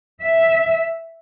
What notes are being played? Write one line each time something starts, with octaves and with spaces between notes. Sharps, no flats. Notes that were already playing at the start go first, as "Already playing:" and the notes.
E5